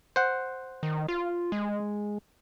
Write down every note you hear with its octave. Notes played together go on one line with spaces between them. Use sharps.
C5 F#5
D#3
F4
G#3